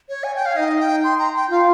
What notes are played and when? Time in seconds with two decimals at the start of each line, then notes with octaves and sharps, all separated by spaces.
0.09 C#5
0.24 G#5
0.36 G5
0.46 F5
0.56 D#4 D#5
0.80 G5
1.04 C6
1.19 A#5
1.35 G5
1.50 F4 F5